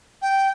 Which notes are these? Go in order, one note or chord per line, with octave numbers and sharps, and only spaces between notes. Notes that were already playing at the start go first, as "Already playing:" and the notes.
G5